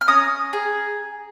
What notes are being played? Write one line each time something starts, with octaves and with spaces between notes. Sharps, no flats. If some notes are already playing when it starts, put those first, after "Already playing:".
F6
C#4 A#5 D#6
G#4